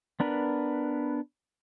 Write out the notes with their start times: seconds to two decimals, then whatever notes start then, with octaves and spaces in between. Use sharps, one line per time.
0.20 B3 D4 A#4 B4